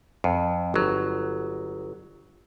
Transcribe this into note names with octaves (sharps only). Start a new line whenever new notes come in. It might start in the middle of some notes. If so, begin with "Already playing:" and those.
F2
G1 F#3